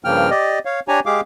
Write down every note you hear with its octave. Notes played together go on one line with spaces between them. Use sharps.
G2 C#3 F3 A#3 G5 F6
G4 D5 D#5
C#5 F5
D4 G4 C#5 G#5 A#5
G#3 G4 G#4 F5 D6